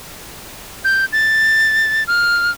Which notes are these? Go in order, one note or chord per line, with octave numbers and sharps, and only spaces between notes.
G6
A6
F6